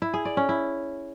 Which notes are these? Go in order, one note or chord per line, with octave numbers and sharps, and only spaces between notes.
E4
G#4
D5
C#4
E4